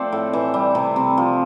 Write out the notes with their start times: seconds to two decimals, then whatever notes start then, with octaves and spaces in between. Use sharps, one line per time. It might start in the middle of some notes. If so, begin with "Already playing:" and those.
Already playing: F3 A3 C4 A4 C5 D5
0.12 A2
0.33 E3 E5
0.54 G3
0.75 C3
0.96 C3
1.18 F3